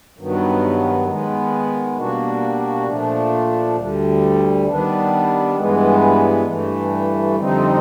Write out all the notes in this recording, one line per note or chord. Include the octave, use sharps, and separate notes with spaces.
G2 D#3 F#3 B3
D#3 G#3 B3
B2 G3 A#3 D4 F#4
A#2 F3 A3 D4
D2 D3 G3
D#3 G3 B3 D4
G2 E3 G#3 B3
G2 E3 A3
F2 D3 G3 C4 D#4